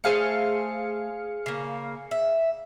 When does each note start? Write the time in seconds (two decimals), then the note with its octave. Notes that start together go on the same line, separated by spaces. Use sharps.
0.04 A3 G#4 C5 F5 A5 C#7
1.46 C#3 A#3
2.11 E5